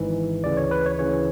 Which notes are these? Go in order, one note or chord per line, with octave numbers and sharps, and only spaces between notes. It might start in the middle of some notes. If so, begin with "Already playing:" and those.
Already playing: G#1 G#2 E3
D2 C#3 E3 D5
C#5
B4
C#5
D2 C#3 E3 C#5